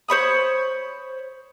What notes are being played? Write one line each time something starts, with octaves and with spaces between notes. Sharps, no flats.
C5 C#5 B5 D#6